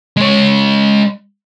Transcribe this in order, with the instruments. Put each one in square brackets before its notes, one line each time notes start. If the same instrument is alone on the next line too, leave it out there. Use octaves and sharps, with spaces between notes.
[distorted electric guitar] G#3 C#5